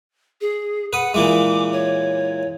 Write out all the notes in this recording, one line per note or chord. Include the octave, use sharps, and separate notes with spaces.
G#4
B4 F#5 D#6
A#2 E3 G#3 D6
C#5